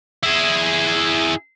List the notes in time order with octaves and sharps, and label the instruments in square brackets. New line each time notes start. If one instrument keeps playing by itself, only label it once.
[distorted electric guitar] E4 G#4